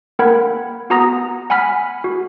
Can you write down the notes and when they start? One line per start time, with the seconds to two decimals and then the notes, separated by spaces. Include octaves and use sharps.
0.19 A#3 A#4 F#5 G5 B5 G#6
0.90 B3 F#4 F#5 A#5 D#6 A#6
1.50 F#5 G#5 B5 F6 B6
2.04 F#4